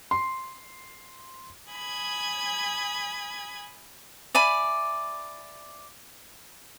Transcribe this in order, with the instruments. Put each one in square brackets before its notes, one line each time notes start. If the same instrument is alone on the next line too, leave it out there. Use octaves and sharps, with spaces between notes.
[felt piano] C6
[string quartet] G#5 B5 D#6 G#6
[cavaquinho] D5 E5 G#5 B5